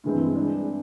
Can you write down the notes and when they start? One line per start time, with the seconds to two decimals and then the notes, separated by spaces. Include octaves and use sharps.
0.04 G2 E3 G#3 C4
0.35 D4